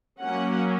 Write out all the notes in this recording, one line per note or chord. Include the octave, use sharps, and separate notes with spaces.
F#3 A#3 C#4 F#5